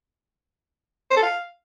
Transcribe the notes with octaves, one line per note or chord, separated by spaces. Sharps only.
C5
A4
F5